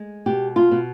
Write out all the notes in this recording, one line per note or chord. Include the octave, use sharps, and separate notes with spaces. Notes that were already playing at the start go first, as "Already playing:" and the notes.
Already playing: G#3
B2 G4
F4
B2